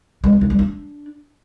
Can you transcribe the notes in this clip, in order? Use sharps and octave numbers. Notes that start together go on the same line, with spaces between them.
G#3
C4
D#3
G3
D4